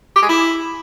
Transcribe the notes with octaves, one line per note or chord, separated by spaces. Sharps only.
G4
G#3
E4